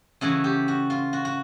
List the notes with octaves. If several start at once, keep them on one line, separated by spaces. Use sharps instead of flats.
C#3 E3 A3 F#4
G4
F#4
F4
F#4
F#4